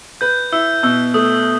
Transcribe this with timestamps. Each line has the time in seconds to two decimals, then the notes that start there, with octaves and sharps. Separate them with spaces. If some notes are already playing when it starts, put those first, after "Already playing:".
0.21 B4 G6
0.52 E4 E6
0.83 B2 E6
1.14 A3 D#6